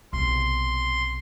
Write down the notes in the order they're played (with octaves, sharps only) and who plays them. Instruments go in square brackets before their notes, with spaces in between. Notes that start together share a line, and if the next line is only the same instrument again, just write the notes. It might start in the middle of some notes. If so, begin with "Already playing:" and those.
[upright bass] B1 C3 [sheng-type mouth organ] C6